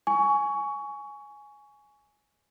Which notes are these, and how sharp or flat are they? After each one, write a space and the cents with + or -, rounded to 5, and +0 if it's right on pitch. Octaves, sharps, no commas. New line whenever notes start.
G#5 +5 C#6 +20